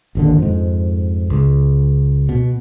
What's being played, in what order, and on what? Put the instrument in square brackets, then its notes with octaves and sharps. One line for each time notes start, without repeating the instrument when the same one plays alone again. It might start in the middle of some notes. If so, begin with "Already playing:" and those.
[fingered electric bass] G#1 D#2 D3
F2 G#2
C#2
B2